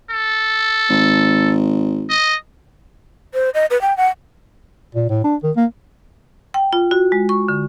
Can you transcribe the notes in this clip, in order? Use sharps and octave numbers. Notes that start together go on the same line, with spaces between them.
A4
G#1
D#5
C5
D#5
B4
G5
F#5
A#2
A2
D4
D#3
A#3
G5
F4
F#4
G#3
C#6
D3